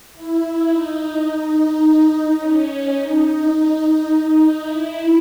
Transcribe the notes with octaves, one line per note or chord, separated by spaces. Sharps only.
E4
D#4
C#4
D#4
E4